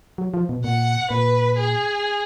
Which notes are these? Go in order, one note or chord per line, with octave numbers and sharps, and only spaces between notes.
F#3
F3
B2
A#2 F#5
A#2 B4
G#4